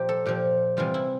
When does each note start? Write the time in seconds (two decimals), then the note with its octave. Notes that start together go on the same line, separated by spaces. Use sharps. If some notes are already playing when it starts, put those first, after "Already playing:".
Already playing: A#2 F3 G4
0.09 A4
0.26 A#2 F3 G4
0.77 C3 E3 G3 F4
0.94 E4